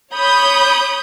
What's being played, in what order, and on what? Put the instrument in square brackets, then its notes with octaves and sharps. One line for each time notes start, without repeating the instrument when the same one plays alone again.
[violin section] C#5 B5 D#6 G6